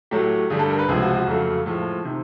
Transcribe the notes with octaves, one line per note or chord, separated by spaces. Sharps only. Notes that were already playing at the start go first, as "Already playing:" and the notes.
A2 F#3 A3 G4
G2 D3 G3 G#4
A4
A#4
B4
C#2 C3 F3 G#3 G#4
F#4
F#4
F2 C#3 F#3 A3
A2 F3 G#3
C3 D#3